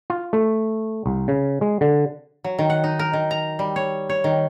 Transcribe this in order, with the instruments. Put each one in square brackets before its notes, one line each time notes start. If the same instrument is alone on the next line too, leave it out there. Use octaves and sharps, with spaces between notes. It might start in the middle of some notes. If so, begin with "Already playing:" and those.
[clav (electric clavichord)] F4
A3
C2
C#3
G#3
D3
[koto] F#3
D#3
F#5
D#4
A#4
D#3
A#5
G3
C#5
C#5
D#3